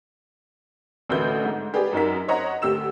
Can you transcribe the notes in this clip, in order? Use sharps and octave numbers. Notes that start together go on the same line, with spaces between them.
A1 D2 F#4 B4 E5 G6
G#2
G4 G#4 B4 D5
F#2 F#3 D#4 A#4 B6
C5 C#5 D#5 F#5 A#5
D2 G4 E6 E7